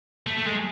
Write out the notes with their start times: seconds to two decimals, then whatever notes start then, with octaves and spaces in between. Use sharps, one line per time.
0.27 A3
0.37 A3
0.47 G#3